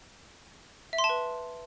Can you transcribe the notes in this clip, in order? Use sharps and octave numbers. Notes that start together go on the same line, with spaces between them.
E5
C6
A5
B4